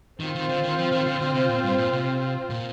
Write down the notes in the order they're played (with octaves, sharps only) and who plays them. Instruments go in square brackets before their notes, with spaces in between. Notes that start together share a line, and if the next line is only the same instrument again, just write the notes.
[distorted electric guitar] D#3 [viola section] C4 F4 C5
[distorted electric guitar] D#3
D3
D#3
F3
D#3
D3
D3
C3
A#2
G2
A#2
C3
A#2